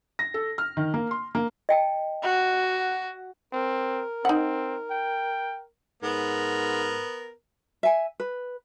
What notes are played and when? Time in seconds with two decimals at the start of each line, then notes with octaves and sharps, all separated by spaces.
0.19 A#6
0.34 A4
0.58 F6
0.77 D#3
0.94 A#3
1.11 C6
1.35 A#3
1.69 D#5 G5 A5
2.23 F#4
3.53 C4 A#4
4.25 C4 D#4 F#5
4.91 G5
6.03 G#2 B3 A#4
7.83 E5 G#5
8.20 B4